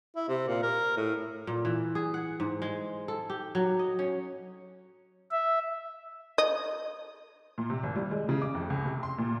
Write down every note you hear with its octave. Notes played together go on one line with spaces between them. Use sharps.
E4
C3
A#2
A#4
A2
A#2
E3
G#4
F#5
G#2
G#3
A4
G4
F#3
D#5
C#4
E5
D#5
A#2
C3
G#1
G3
G#3
C#3
D6
F2
C#2
C3
C6
A#2